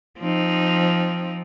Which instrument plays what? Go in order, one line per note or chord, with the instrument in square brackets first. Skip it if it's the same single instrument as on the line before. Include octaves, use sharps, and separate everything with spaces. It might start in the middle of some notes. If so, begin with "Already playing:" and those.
[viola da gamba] F3 C4 D#4